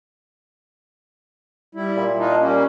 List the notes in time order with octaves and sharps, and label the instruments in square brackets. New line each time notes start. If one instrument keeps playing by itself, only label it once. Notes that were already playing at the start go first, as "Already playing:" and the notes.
[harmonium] G3 E4
[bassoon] A#2
[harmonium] D4 D#4 F4
G3 A#3 C#4